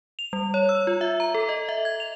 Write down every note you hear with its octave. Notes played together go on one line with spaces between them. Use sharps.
F7
G3
C#5
E6
F4
E5
A#5
A4
D#5
E5
G#6
F7